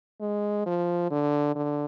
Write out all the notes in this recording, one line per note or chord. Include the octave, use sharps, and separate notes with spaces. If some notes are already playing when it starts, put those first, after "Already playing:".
G#3
F3
D3
D3